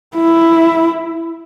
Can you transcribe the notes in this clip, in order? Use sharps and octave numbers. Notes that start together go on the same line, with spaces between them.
E4